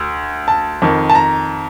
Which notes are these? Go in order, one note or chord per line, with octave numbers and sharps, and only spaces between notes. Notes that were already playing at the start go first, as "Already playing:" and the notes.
Already playing: D2
A5
F2 D#3
A5
A#5